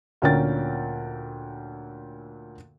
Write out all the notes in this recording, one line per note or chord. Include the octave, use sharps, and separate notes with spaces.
D2 A#2 C#4 A#4 G5 A6